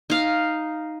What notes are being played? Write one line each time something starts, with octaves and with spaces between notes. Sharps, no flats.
D#4 F5